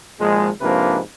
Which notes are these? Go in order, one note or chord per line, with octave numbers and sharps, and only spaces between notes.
G#1 A#2 F3 G#3
G#2 C3 F3 A#3 D4 B4